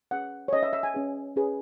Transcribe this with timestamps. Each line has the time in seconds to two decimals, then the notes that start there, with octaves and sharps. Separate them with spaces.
0.11 C#4 G#4 B4 F#5
0.48 C#5
0.53 C#4 G#4 B4 D#5
0.63 E5
0.73 E5
0.83 G#5
0.94 C#4 G#4 B4
1.36 C#4 G#4 B4